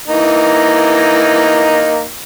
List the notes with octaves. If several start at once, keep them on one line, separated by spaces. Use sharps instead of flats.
E3 A#3 D#4